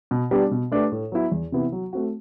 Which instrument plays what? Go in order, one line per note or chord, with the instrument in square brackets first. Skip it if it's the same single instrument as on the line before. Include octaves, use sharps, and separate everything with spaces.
[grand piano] B2
G3 B3 D4 G4
B2
A3 D4 G4 B4
A2
F#3 B3 E4
E2
C3 E3 B3 E4
F#3
A3 C4 F#4